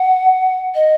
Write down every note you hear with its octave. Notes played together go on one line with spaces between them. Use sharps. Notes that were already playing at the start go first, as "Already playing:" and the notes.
Already playing: F#5
D#5